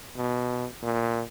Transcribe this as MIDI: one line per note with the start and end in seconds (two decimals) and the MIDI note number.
0.16 0.66 47
0.83 1.22 46